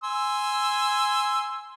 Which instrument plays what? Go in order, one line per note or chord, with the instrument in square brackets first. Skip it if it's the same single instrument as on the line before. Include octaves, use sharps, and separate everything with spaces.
[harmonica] G#5 C6 E6